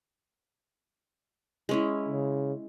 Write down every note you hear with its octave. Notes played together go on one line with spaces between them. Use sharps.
G#3 C#4 E4
C#3